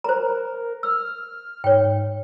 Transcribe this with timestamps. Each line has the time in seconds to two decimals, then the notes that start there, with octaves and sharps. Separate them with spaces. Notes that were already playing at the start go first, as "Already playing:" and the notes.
0.04 A#4 C5 A#5
0.83 E6 F6
1.64 G#2 C#5 G5